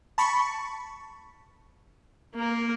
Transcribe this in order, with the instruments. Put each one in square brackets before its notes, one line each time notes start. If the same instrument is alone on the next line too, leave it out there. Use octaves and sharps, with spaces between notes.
[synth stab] A5 B5 C#6
[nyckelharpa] A#3 A#4